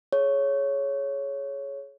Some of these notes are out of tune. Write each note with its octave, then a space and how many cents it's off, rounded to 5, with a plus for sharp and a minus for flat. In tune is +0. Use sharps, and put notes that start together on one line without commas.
G#4 +30 C#5 +0